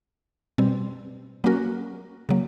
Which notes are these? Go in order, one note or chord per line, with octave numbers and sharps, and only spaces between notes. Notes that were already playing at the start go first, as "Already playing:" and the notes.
B2 G3 C4
F#3 A#3 C#4 F#4 A#4
C#3 F#3 A#3